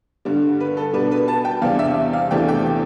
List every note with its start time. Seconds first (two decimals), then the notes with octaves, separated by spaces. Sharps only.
0.25 G2 D3 G3
0.60 B4
0.77 A4
0.93 B2 G3 D4 B4
1.11 B4
1.28 A5
1.45 G5
1.62 E2 C3 G3 D4 F5
1.79 E5
2.13 F5
2.31 E2 C3 E3 A3 D4 G5
2.49 G5